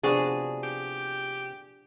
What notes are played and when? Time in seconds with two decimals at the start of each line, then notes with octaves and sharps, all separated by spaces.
0.03 C3 F3 B3 D4 F#4 G#4 D5
0.63 G4